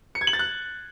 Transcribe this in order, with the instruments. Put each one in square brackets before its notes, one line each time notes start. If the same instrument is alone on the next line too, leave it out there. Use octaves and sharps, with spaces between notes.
[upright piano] C#7
G#6
F#7
A6
F#6